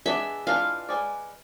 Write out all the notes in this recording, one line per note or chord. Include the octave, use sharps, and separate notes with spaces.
G#3 B3 D4 G#4 E5
E3 G#3 D4 F4 B4 F5
G#3 C4 G#4 B4 D5